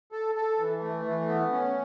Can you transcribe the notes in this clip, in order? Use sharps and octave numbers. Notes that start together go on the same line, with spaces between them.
A4
A4
E3
A3
E3
B3
C#4